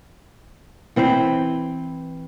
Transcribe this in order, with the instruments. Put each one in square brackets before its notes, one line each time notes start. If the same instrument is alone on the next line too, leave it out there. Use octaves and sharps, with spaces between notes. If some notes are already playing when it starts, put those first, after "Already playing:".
[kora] E3 C4 B4 C5